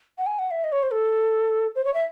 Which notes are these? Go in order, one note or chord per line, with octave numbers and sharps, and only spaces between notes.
F#5
G#5
F#5
E5
D#5
C#5
C5
A4
C5
C#5
E5